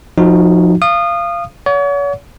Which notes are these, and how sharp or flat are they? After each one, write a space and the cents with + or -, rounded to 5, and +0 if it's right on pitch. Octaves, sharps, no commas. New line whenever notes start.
F3 +20 D#4 -10 F#4 +0
F5 -20 D#6 -25
C#5 +40 F#5 -25